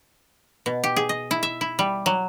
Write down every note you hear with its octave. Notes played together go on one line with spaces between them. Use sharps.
B2
G4
G#4
D#5
E4
E5
E4
G3
F#3